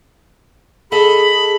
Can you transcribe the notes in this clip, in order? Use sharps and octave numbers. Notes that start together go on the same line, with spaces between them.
G#4 A4 D#5 A5 B5